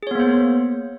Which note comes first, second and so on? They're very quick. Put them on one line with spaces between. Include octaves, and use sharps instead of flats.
G#4 C#5 B3 A#3 C5